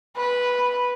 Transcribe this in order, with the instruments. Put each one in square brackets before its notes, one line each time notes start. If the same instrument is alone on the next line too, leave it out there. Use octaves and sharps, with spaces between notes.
[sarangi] B4